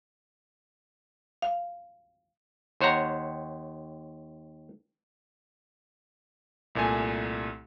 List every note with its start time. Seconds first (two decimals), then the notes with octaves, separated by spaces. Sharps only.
1.42 F5
2.81 D#2 C5 C#5 F#5 A#5
6.75 C2 A#2 A3 G#5